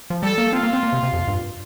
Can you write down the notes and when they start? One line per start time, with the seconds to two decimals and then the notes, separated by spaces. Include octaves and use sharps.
0.10 F3
0.23 G3 A4
0.38 A#3
0.52 C4 F4
0.63 A#3
0.73 C4
0.83 A#3
0.93 C3
1.03 C3
1.13 F2
1.28 G2